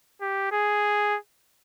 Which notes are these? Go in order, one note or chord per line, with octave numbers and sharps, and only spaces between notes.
G4
G#4